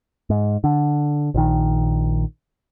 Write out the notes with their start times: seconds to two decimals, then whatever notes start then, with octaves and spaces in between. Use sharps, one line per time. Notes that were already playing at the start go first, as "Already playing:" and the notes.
0.30 G#2
0.64 D3
1.34 A#1 D#3